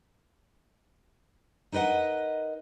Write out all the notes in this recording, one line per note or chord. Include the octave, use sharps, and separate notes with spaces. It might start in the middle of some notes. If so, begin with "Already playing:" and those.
D#4 A#4 B4 D#5 F#5